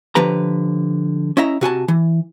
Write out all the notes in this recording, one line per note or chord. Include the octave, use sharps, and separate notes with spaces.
D3 F3 G4 B4 A#5
C#4 E4 D#5 E5 A#5
C3 F#4 G#5 A5
E3